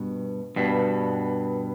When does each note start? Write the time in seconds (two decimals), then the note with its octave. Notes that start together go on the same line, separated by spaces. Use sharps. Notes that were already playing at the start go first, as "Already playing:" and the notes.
Already playing: G2 B2
0.56 G2 B2